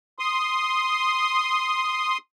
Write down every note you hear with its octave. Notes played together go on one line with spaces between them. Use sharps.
C6 D#6